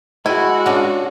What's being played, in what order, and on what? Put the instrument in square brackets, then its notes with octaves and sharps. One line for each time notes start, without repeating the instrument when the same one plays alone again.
[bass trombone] G#3 [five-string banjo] E4 [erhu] F#4 [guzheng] G5 G#5
[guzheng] C#4 D4 G#4